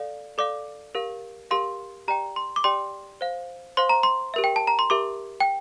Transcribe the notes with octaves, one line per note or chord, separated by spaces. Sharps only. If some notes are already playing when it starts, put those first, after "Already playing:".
Already playing: A4 D5 F5
A4 D5 F5 D6
G4 A#4 F5
G4 A#4 F5 C6
G4 D5 G5 A#5
C6
D6
G4 D5 G5 C6
C5 F5
C5 F5 C6
A#5
C6
G4 A#4 E5
G5
A5
A#5
C6
G4 A#4 E5 D6
G5